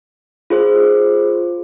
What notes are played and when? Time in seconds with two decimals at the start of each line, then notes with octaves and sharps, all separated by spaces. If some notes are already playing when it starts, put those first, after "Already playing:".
0.50 F4 G#4 C5